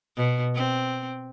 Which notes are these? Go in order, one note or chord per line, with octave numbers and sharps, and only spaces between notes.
B2
C4